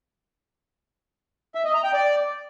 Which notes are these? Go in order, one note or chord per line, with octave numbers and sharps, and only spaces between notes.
E5
D#5
A#5
G5
D5